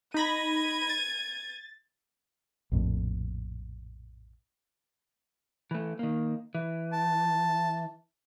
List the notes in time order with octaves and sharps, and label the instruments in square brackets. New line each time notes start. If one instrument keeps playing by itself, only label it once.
[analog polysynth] D#4 B5 A#6 [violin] G#6 D#7
[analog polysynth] A6
[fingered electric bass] A#1 F2 A2
[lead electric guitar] E3 A3
D#3 A#3
E3
[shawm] A5